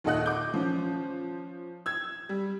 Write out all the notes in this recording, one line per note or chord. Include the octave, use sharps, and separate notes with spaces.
D#2 A#2 A4 D#5 F#5 F#6
D6 G6
F3 C#4
E6 G#6
G3